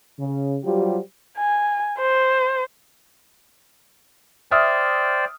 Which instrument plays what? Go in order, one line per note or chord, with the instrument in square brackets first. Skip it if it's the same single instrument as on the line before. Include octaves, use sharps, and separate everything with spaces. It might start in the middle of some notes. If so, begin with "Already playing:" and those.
[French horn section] C#3
F#3 G3 F4 G4 C5
[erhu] G#5
C5
[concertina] C5 D5 G5 [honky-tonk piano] E5 D#6 F6